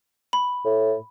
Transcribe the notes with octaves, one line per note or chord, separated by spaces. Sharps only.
B5
A2